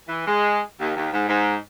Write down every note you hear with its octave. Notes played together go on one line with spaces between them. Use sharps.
E3
G#3
D#2
D#2
G#2
G#2